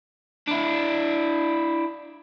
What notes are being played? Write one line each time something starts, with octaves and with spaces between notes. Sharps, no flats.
D4 E4